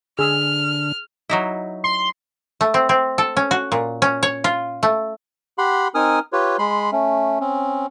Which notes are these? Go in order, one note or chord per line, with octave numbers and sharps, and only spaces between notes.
D3 G#4 E6 F6
F#3 D#4 E4
C6
A3
C4
C4
A4
C#4
F#4
A#2
C#4
C#5
F4
A3
G4 F#5 B5 C6
C4 D#4 A#4 G#5 D#6 F6
F4 G4 B4 C#5
G#3 B5 C6
A3 C#4
C4 C#4